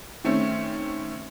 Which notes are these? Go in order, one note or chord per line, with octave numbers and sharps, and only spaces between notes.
D#3 A3 C4 C#4